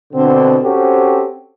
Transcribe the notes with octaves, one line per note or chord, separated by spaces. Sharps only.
B2 D3 C4
C4 C#4 F#4 G4 A4 C5